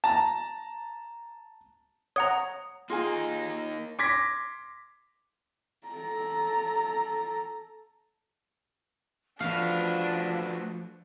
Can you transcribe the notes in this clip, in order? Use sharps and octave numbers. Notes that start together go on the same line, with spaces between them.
A5 A#5
C#5 F#5 A#5 D#6
A#3 D#4 F4 G#4 G#5
C6 D6 G#6 A#6 B6
A4 A#5
F3 A3 D4 F#4 B4 F5